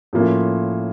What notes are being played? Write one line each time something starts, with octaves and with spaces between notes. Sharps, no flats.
A2 F3 A#3 C#4 F4